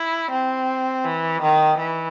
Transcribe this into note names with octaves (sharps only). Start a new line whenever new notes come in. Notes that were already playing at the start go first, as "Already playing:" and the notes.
Already playing: E4
C4
E3
D#3
E3